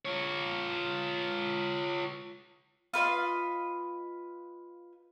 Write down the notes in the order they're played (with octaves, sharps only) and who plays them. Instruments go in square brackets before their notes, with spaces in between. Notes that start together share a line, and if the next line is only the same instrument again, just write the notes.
[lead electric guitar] F4 C#5
[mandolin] F4 B4 D#5 F5